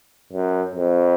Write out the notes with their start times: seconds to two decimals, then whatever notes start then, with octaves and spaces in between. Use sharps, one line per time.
0.33 F#2
0.75 F2